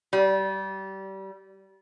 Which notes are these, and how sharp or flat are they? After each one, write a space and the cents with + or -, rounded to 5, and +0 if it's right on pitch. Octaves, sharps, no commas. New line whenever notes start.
G3 -25